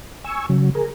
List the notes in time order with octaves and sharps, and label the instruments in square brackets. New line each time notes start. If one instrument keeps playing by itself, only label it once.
[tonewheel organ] G#5 C#6 E6
C#3 F#3
G#4 A#4